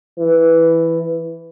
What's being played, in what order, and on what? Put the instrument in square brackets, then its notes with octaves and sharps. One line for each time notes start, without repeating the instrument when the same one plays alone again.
[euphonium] E3